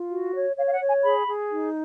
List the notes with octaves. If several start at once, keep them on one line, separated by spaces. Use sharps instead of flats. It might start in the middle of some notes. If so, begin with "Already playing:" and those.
Already playing: F4
F#4
C#5
C#5 F5
F5
F#5
C#5
G#5
G#4 B5
G#4
D#4